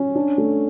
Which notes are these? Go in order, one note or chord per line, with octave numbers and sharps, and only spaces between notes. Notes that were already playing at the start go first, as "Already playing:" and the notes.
Already playing: C#4
D4
A3